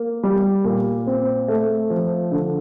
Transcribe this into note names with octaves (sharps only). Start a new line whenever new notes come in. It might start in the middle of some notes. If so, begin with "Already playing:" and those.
Already playing: A#3
G3
A#2
C4
A3
F3
D3